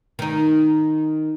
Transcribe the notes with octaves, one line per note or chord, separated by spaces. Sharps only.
D#3 D#4